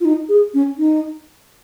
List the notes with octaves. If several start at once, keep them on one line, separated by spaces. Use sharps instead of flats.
F4
D#4
G#4
C#4
D#4